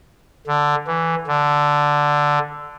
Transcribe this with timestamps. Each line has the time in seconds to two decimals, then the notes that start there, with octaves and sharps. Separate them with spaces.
0.47 D3
0.87 E3
1.27 D3